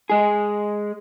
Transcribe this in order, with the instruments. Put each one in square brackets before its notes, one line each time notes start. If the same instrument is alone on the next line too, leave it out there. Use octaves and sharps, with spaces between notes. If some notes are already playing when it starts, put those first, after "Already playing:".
[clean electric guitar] G#3 G#4